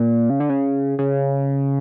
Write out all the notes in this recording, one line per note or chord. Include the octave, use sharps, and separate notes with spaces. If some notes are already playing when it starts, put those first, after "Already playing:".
Already playing: A#2
C#3
D3
C#3
C#3